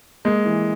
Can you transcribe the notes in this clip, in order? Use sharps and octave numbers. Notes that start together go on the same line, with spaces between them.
G#3 A#3
E3